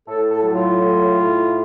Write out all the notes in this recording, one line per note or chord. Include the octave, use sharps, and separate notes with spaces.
A2 A4
A4
F#3
F4
A2
A2